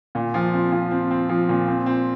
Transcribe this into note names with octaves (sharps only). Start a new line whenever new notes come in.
A#2
F3
C4
F3
C4
C4
F3
A#2
C4
C4